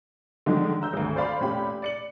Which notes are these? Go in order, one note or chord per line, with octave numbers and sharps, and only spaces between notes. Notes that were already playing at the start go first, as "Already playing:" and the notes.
D3 D#3 F3 F#3 G#3 A3
A#5 E6 G6
G#1 D2
C5 D5 F5 B5 C6
F1 A#2 C#4 G4 B5
D5 C#7 F#7